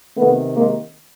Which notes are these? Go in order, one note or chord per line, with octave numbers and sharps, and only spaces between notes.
C3 D#3 A3 B3
G#3 A#3